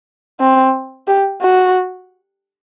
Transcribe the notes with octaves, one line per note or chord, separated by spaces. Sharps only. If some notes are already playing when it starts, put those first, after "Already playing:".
C4
G4
F#4